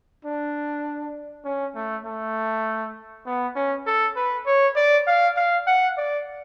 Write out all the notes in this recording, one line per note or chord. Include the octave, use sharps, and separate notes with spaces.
D4
C#4
A3
A3
B3
C#4
A4
B4
C#5
D5
F5
F5
F#5
D5